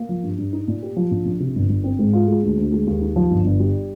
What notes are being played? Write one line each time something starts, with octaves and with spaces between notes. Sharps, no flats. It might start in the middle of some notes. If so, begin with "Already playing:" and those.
Already playing: A#3
F3
G2
G2
D#4
A#2
G4
F3
A#1
A#1
C3
G1
G1
C4
G#2
F4
G#3
D2
D2
G#3
D#2
D#4
F3
G1
G1
G3